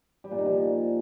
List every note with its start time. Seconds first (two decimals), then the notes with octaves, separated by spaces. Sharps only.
0.24 G3
0.31 A#2
0.38 D#3
0.46 F3